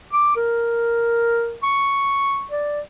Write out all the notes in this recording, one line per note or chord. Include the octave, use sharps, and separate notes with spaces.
D6
A#4
C#6
D5